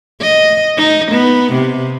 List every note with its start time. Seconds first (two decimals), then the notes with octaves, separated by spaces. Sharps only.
0.21 D#5
0.77 D#4
1.12 B3
1.53 C3